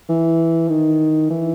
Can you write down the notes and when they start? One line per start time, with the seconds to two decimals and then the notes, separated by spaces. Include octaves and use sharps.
0.09 E3
0.69 D#3
1.30 E3